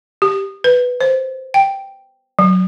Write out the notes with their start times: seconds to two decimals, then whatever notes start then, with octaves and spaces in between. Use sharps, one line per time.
0.22 G4
0.64 B4
1.01 C5
1.54 G5
2.39 F#3